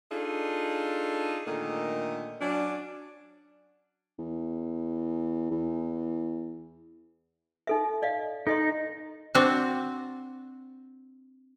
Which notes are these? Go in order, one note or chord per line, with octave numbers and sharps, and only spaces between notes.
D4 D#4 F4 G#4 A4
A#2 D3 D#3 A3 D#5
F#3 C#4 D4
E2
E2
D#4 A4 E5
D5 D#5 F5
D#4 A4 D#5 C6
C4 D4 F#4